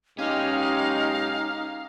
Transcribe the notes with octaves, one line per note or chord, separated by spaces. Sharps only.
B1 G#3 C#4 D#4 G4 F5